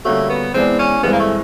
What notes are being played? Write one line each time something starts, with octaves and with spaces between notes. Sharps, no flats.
D3 G3 A3 A#3 C#4 F#4
B3
E3 G#3 B3 C4 D4
C#4
G2 E3 G#3 B3 C4
A#3
A3